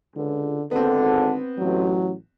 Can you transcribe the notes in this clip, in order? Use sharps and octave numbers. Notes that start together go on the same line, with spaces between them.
C#2 D3
G#1 D3 B3 C4 A4
A1 F#3